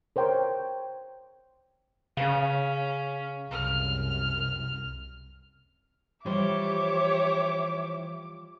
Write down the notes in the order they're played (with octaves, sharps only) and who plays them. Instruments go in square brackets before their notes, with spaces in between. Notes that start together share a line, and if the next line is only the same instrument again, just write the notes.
[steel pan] A#4 C5 C#5 G5
[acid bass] C#3 [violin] C#4 [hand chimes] F5
[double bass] C2 F#2 [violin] F6
[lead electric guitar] E3 C5 [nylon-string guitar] F3 G3 [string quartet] G4 C#5 E5 [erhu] D6